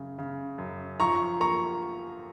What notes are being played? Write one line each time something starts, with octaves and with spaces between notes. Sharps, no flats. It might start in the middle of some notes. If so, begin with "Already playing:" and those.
Already playing: F#2 C#3
C#3
F#2
F3 A#5 C#6
A#3 A#5 C#6